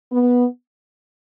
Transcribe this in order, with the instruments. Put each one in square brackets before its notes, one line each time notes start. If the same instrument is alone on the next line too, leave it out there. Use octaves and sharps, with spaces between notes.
[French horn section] B3